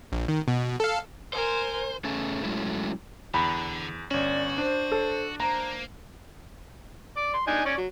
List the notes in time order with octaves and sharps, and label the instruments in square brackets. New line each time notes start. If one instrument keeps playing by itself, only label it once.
[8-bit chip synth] A#1
D#3
B2
A4 F5
[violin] A#4 G#5 [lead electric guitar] C5
[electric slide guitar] A3 C#4 G#4 A4
F#3 G#3 A3 C#4 E4
[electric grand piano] E2 [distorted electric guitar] D3 [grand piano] B5
[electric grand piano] G1 C#4 [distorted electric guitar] F#4 [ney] D5
[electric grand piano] D4 [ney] C5
[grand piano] A4
[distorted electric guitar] A#3 [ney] C5 [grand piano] A#5
[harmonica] D5 D6
C6
D4 D#4 G#5
C#4 C#5 D5
F#3